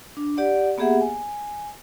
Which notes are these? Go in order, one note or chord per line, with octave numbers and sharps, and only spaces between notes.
D4
G4 D5 F#5
A#3 B3 G4 G#4 E5 F#5
G#5